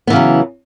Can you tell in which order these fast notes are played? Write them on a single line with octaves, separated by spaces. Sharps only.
B3 E3 C#3 F#3